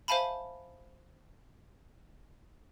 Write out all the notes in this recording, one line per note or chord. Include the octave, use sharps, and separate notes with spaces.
C5 E5 F5 G#5 A5 B5